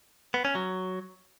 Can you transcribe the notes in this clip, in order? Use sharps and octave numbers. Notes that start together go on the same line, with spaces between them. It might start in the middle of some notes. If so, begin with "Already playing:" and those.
B3
C#4
F#3